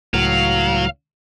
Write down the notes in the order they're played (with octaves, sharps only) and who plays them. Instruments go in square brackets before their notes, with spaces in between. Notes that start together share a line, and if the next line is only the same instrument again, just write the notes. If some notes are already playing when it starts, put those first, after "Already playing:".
[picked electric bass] C#2 A2 [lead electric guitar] F#3 [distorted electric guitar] F5